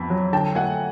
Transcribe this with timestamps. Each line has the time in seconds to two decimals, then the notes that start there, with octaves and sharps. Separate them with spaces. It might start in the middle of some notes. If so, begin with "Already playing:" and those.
Already playing: F2 B3 B5
0.10 F#3
0.33 D3 G5 A5
0.55 A3 F#5 G#5